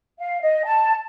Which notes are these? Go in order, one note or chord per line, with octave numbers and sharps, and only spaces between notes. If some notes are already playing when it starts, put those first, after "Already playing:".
F5
D#5
A5